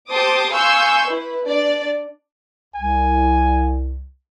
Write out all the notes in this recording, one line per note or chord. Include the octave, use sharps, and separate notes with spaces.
G4 C5 A5 C6 D6 D#6
F5 G#5 C6 C#6 E6 G6
E4 B4
D4 D5
C2 G#5